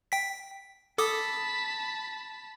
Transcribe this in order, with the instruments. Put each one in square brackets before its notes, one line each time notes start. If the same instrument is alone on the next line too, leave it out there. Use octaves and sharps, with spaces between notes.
[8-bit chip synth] G5 B6
[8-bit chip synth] A4 D6 D#6 [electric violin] A5 B5